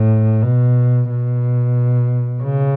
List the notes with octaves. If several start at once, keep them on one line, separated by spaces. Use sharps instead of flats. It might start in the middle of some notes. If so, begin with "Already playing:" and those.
Already playing: A2
B2
B2
C#3